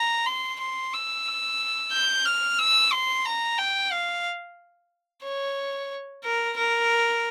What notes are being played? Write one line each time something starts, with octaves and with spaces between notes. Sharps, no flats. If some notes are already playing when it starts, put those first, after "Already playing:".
Already playing: A#5
C6
C6
E6
G6
F6
E6
C6
A#5
G5
F5
C#5
A#4
A#4